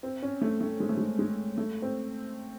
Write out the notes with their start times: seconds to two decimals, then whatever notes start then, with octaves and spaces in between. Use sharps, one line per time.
0.03 C4
0.22 C#4
0.41 A3
0.61 A3
0.80 G#3
0.89 A3
0.97 G#3
1.19 G#3
1.58 A3
1.82 C4